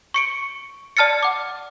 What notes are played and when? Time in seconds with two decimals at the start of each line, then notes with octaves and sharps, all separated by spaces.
0.14 C#6 C#7 D7
0.97 D5 A5 F6 A6 C#7
1.23 F#5 D6